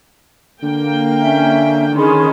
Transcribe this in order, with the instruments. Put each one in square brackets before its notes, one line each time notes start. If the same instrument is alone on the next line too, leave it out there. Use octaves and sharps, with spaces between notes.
[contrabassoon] D3 [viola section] A#3 G5
[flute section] C#4 E5
[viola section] D#3 C#4 [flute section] G#4 B5 C6